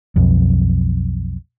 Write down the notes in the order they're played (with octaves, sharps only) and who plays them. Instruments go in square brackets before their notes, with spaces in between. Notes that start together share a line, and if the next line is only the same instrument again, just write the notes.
[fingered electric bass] B1 F2